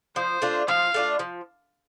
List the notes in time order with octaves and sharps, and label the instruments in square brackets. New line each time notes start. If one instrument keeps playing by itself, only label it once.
[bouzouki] F3 [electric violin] C5
[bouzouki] A3 D4 F4
[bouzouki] F3 [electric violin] F5
[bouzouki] A3 D4 F4
F3